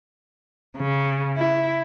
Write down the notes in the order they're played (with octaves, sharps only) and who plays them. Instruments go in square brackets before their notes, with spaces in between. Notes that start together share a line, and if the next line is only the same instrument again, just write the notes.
[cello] C#3
E4